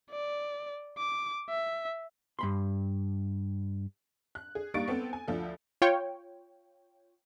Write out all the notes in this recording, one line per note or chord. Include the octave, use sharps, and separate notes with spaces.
D5
D6
E5
G2 B5 C6
F#6
G#4
G3 A#3 D#4 C#6 A6 D7
B3 C4 A4
G#5
D2 F3 A4
F4 C#5 G5